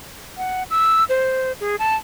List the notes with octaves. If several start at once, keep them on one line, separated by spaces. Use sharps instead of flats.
F#5
E6
C5
G#4
A5